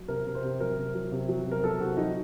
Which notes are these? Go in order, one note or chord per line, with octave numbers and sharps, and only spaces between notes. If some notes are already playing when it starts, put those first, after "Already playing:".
Already playing: F#3
C3 A#4
C3
C5
C3
F#3 A#4
C3
F#3
C3
F#3
C3
A#4
F#3 A4
C3 F#4
F#3 D#4